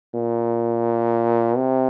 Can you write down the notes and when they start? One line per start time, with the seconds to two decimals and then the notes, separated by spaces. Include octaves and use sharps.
0.15 A#2
1.57 C3